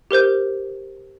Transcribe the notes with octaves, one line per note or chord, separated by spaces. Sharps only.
G4 A#4 C5 G6